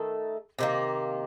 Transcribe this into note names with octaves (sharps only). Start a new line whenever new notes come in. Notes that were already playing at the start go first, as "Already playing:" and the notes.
Already playing: D#3 A3 A4
C3 D#3 A#3